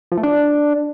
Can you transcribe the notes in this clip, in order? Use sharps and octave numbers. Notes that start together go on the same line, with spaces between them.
F3
A3
D4